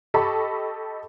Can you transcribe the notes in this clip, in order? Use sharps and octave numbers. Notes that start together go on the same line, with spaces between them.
G4 A4 D#5 A5 B5 C#6